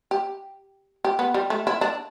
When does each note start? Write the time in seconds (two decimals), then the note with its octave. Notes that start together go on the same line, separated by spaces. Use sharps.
0.11 G4
1.05 G4
1.19 B3
1.34 G3
1.50 A3
1.67 E4
1.81 D4